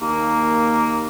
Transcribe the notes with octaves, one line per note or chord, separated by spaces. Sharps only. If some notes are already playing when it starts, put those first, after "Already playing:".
D#2 A#3